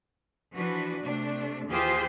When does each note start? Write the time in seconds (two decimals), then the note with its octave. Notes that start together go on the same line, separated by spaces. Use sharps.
0.54 E3 F3 D4 F#4 B4
1.04 C3 A3 D4
1.69 D#2 E3 F4 G4 G#4 C5